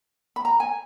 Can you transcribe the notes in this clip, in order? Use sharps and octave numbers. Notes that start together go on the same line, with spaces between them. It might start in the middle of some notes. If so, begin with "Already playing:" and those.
B5
A#5
G#5